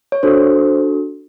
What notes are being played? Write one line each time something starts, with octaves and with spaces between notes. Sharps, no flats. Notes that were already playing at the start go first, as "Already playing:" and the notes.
C#5
D4 F#4 A4 C5